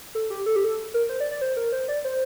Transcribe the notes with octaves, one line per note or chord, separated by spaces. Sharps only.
A4
G4
A4
G4
A4
A#4
C5
D5
D5
C5
A#4
C5
D5
C5